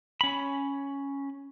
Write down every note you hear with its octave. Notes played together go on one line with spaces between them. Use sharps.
C#4 B5